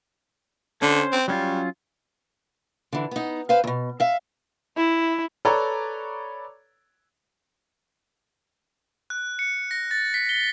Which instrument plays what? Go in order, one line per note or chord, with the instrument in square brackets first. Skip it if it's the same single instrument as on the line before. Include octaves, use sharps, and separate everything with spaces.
[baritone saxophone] D3 [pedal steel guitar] C#4 C5
[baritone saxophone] C4
[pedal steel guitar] F#3 C#4 F4 [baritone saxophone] G3
[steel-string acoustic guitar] D3 E3
B3 D#4
B4 C5 F5
E2 B2
E5 F5
[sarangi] E4
[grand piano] A4 B4 C#5 D5 A#5 C#6
[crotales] F#6
C#7
A#6
A6
B6
G7